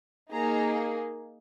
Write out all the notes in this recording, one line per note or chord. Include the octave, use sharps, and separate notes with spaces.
A#3 D#4 G#4 A#5